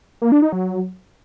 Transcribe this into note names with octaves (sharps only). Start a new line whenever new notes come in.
A#3
D4
D#4
F#3